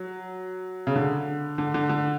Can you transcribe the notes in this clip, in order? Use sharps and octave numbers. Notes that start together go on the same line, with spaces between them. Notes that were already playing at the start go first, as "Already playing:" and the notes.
Already playing: F#3
C#3
D3
D3
D3
D3